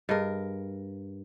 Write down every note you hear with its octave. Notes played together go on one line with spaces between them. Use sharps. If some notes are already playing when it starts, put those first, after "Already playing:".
G2 G#4 A#4 D#5